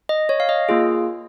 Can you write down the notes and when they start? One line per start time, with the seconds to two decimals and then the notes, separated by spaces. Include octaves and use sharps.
0.09 D#5
0.29 C#5
0.40 F5
0.49 D#5
0.69 A#3 F4 G#4